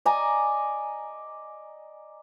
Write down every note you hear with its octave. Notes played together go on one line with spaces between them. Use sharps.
D5 D#5 G#5 A#5